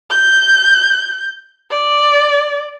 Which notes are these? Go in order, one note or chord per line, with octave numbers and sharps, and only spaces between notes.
G6
D5